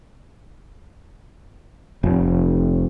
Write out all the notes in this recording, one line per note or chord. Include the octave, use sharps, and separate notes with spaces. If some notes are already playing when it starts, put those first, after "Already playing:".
F1